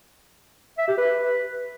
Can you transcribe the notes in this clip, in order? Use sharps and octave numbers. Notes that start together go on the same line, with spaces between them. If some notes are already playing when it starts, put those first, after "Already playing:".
E5
G4
B4